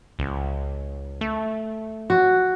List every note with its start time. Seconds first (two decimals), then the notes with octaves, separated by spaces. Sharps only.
0.19 C#2
1.21 A3
2.10 F#4